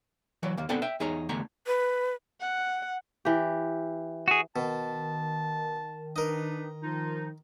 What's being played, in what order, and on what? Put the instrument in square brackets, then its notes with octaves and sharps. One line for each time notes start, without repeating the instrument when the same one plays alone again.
[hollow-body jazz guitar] E3 F#3 D5
D#2 A#3
B3 C4 D4 A4 F#5 G#5
E5 G5
E2 D#4 G#4 C#5 A#5
E2 D3 A3 G#5 A#5
[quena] B4
[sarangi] F#5
[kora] E3 G4
[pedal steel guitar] F#4 G#4
[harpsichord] B2 [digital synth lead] D#3 [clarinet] A5
[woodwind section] D4 D#4 B4 [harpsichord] A#4 D#5
[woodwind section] F3 D#4 [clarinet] F4